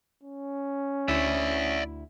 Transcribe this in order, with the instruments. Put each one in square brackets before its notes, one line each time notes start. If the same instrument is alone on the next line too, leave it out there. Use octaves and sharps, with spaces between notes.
[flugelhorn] C#4
[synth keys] D2 E4 [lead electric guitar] D5 E5